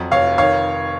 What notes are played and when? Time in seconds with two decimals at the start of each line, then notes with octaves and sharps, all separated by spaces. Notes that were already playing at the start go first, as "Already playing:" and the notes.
Already playing: F2 F#3
0.11 F1 C#5 F5
0.38 D#3 C#5 F5